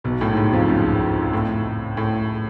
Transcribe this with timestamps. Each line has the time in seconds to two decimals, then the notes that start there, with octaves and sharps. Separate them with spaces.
0.04 B1 B2
0.21 A2
0.32 G#2
0.37 A2
0.52 F2 F3
0.69 C#2 C#3
1.33 A2
1.97 A2